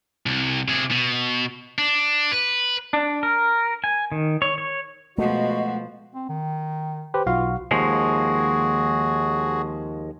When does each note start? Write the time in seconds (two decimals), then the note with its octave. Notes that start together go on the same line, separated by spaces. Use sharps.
0.26 C2
0.68 C3 G#4
0.91 B2
1.78 D4
2.32 B4
2.93 D4
3.23 A#4
3.84 G#5
4.12 D#3
4.42 C#5
4.58 C#5
5.18 B2 F3 G#3 A3 F#4 D#5
6.14 C4
6.29 D#3
7.14 G4 B4 C5
7.26 B1 F4 F#4 F5
7.71 D#2 F3 G#3 F#4 G#4